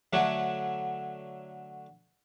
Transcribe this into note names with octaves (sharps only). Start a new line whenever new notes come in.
D3 F#3 A3 D4 F#4 C#5